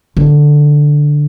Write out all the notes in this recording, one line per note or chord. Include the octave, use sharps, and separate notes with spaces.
D3